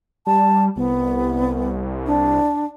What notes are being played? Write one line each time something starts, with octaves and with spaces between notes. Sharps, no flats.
G3 A5
C2 B3
D4